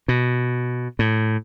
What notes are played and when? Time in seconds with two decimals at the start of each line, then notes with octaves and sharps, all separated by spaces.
0.08 B2
0.99 A2